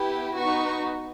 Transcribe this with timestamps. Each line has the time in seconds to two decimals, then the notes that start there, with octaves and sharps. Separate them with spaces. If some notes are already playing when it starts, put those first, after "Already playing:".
Already playing: B3 E4 G4
0.37 B3 D#4 F#4 C#6